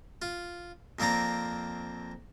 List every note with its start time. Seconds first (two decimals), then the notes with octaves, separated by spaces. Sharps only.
0.22 F4
0.99 F2 A#3 C4 D5 A#5